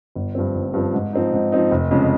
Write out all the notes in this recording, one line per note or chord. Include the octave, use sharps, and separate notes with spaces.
G1
G2 F3 C4
G1
G2 F3 C4
G#2
F3 C4 D#4
G#2
F3 C4 D#4
F1
F2 C#3 G#3